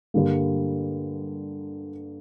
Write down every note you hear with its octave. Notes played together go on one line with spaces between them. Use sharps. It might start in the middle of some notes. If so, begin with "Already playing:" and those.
G2 D3 G3 A#3